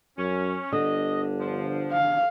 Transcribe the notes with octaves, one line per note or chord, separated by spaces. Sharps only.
F#2 C#4
G1 D3 D#5
F3
F5